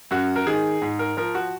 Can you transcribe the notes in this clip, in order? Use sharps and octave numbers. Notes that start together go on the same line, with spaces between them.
F#2 F#4
A#4
D#3 G#4
G#2
A#4
F3 A#4
F#4